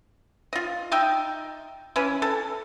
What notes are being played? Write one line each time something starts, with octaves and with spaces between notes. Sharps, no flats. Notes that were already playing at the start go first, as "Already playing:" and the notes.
F4 D#5
D#4 D#5 E5 G5
E3 C#4 B4
A4